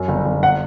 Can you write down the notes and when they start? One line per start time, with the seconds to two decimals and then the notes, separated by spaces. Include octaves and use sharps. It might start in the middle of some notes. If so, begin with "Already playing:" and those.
Already playing: F#2
0.08 G1
0.25 G1
0.43 F#5